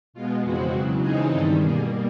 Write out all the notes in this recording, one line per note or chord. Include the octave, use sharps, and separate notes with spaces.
B2 G#3 B3 F4
F2 C#3 E3 G#3 C4 F#4
E2 C#3 F#3
C#3 E3 G#3 C4 D#4 G#4
G2 D#3 G3 A4
B2 G3 A#3 G#4